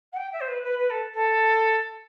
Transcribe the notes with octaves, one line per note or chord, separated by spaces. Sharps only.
F#5
G5
E5
C5
B4
B4
B4
A4
A4